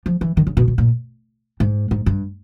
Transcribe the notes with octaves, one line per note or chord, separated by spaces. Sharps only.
F3
E3
D#3
C#3
B2
B2
A#2
G#2
G#2
G2